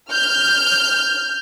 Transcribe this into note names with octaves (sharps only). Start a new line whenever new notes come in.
F6 G6